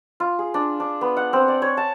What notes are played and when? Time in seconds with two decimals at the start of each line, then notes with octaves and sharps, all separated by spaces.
0.20 F4
0.39 G#4
0.54 D4
0.80 D4
1.01 B3
1.17 F#5
1.33 C4
1.48 D5
1.62 C#5
1.77 A5